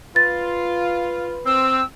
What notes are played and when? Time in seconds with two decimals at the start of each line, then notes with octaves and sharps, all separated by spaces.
0.16 F4 B4 A6
1.46 C4 E6